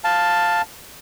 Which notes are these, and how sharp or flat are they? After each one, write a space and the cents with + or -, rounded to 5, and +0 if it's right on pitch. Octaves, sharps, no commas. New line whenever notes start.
F5 +0 A5 +0